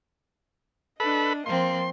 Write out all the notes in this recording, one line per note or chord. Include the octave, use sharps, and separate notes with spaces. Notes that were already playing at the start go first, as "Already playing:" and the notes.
D4 A4 B4 D#5 B5
F3 A#3 C4 C6